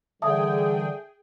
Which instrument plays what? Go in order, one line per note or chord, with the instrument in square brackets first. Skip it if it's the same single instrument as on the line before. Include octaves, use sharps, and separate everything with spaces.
[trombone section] D3 [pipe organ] E3 G3 [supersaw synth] G#4 G5 [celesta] E5 A5 D#6